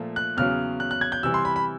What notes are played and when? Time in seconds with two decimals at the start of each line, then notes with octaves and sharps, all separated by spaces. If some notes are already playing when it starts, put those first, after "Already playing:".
Already playing: A#2 F3 A3
0.16 F#6
0.37 E2 C#3 F#3 F6
0.80 F#6
0.91 F#6
1.01 G#6
1.12 G6
1.23 C3 E3 G3 E6
1.34 C6
1.45 B5
1.56 B5